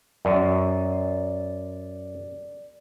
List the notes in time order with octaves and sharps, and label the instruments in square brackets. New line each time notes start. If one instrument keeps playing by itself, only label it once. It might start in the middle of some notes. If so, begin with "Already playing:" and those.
[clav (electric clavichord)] F#2 [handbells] D5